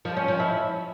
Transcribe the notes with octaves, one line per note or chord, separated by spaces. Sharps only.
F3
C#4
F3
E4